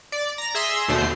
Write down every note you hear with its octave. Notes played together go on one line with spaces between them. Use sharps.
D5
A#5 A#6
G#4 E5 C6 E6 A#6
D#2 B2 D3 A3 C5 C7